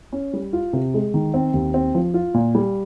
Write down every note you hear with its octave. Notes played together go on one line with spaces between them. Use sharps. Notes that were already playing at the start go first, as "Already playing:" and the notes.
C#4
G3
F4
C3
G#3
D#3
C4
D#2
C4
F3
F4
A#2
G3